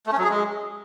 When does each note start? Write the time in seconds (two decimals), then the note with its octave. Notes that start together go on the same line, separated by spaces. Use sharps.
0.07 A3
0.12 C#4
0.18 F#3
0.24 G#4
0.30 G#3